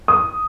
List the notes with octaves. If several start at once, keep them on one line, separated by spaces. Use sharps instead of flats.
D#6